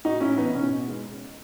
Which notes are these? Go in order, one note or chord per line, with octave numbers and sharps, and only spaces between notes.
A2 D#4 F#4
A2 C#4 E4
E3 B3 D#4
B2 C#4
B2
G#3